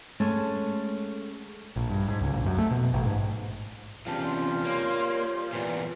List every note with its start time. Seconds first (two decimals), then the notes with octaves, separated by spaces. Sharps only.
0.20 G#3 A3 C#4 A4 C#5
1.76 A#1
1.90 G2
2.08 G#2
2.21 C#2
2.33 A#1
2.46 F#2
2.58 A3
2.71 B2
2.93 A1
3.07 G#2
4.07 E2 C3 F3 G3 C#4 F4 A5
4.24 C6
4.65 A#3 C#5
5.53 E2 A#2 B4 D5